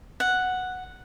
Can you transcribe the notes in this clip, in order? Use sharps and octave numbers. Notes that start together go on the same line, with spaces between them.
F#5